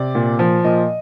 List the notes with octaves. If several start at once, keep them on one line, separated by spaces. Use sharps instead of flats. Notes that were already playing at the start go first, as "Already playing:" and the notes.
Already playing: C3 D5
A#2
F3
A#2 D#5